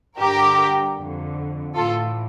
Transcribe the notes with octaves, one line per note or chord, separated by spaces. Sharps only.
G2 D3 G4 A#4
F2 D3
A2 E3 F4 A4